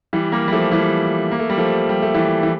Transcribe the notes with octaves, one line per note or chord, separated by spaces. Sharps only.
E3 G3
G3 A#3
G3
F3 A3
E3 G3
A#3
A3
G3
F3 A3
G3
A3
E3 G3
E3